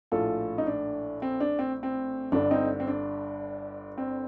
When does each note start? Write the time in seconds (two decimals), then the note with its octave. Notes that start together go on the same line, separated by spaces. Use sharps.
0.12 A#1 A2 F4 A4
0.58 D#4
0.67 D4
1.22 C4
1.40 D4
1.59 C4
1.83 C4
2.32 G1 G2 D3 D4
2.51 C4 D#4
2.80 C4
2.87 D4
3.98 C4